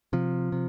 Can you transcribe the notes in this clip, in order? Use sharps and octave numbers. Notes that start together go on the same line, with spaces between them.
C3 F3
C3